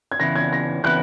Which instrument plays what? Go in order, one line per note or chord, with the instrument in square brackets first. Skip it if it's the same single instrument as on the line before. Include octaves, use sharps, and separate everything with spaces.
[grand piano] G#6
[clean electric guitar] C#3 E3 B3 E4 [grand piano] A#6
[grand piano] G#6
A#6
[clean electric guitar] C#3 E3 B3 E4 [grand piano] F#6